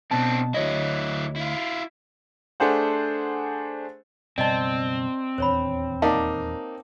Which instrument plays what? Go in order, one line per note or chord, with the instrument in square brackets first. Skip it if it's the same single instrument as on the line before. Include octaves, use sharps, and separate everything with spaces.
[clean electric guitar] B2 A5 [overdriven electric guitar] C4 D4
[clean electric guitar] D2 C#5 D#5 [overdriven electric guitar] F#3 E4
[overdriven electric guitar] E4 F4
[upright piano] A3 D4 G#4 C5 F#5
[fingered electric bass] F#1 B2 G3 [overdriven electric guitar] C4 [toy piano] D5 D#5 A5
[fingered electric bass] D#1 E2 D4 [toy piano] C5 C#5 B5
[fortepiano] A#3 D#4 D5 [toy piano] F5 F#5 A5